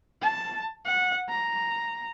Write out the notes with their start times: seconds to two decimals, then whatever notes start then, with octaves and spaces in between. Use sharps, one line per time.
0.22 A5
0.85 F#5
1.29 A#5